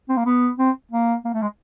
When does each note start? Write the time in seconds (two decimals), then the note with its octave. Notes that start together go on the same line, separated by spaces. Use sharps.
0.09 C4
0.17 A#3
0.26 B3
0.58 C4
0.91 A#3
1.25 A#3
1.34 A3
1.42 G#3